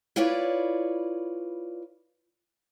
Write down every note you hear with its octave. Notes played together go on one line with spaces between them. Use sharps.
E4 F4 B4 C#5 D5